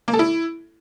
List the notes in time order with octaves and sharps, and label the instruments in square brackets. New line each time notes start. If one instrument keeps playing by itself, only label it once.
[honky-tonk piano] A#3
A4
E4